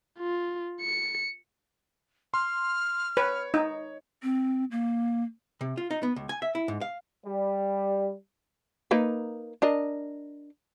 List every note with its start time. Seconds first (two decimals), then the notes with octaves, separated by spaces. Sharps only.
0.18 F4
0.81 C#7
2.34 C6 F6
3.17 B4 C#5
3.54 D#4
4.23 C4
4.71 A#3
5.61 C3
5.77 F4
5.91 D#4
6.03 B3
6.16 C#2
6.29 G#5
6.42 E5
6.55 E4
6.68 G#2
6.81 F5
7.26 G3
8.91 A#3 D#4 B4
9.62 D4 A#4 D#5